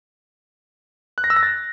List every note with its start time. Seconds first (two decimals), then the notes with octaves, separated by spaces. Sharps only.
1.18 F#6
1.24 A#6
1.30 E6
1.36 A#6
1.43 A6